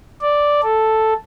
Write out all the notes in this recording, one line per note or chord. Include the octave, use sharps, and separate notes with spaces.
D5
A4